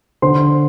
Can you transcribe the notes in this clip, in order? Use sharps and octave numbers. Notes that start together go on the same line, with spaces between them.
D3 C5 C6